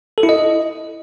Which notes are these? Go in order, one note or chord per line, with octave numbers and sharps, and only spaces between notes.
A4
E4
D#5